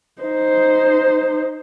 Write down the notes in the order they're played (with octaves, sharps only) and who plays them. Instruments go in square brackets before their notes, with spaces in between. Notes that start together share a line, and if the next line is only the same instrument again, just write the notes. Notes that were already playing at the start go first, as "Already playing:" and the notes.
[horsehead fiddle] D#4 C5